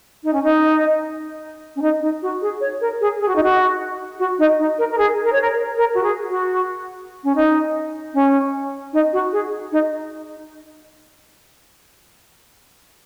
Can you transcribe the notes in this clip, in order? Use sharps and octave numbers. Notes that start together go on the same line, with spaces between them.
D#4
C#4
D#4
C#4
D#4
D#4
F#4
G#4
C#5
A#4
G#4
G#4
F#4
D#4
F#4
F#4
D#4
D#4
A#4
A#4
G#4
A#4
C#5
A#4
A#4
F#4
G#4
F#4
C#4
D#4
C#4
D#4
F#4
G#4
D#4